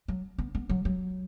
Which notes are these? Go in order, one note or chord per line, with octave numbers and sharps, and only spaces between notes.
F#3
B3
B3
F#3
F#3